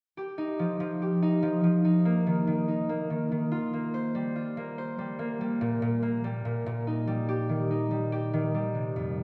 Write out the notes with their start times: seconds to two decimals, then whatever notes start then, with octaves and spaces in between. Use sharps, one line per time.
0.17 G4
0.38 D#4
0.59 F3
0.80 F3
1.02 G4
1.22 D#4
1.42 F3
1.64 F3
1.85 D#4
2.05 A#3
2.27 D#3
2.47 D#3
2.68 D#4
2.89 A#3
3.10 D#3
3.32 D#3
3.52 F4
3.73 A#3
3.94 C5
4.15 G3
4.36 F4
4.57 A#3
4.78 C5
4.99 G3
5.19 A#3
5.41 G3
5.61 A#2
5.82 A#2
6.02 A#3
6.24 G3
6.45 A#2
6.66 A#2
6.87 D#4
7.07 G3
7.29 G4
7.49 D#3
7.71 D#4
7.91 G3
8.12 G4
8.33 D#3
8.54 G3
8.75 C3
8.96 F2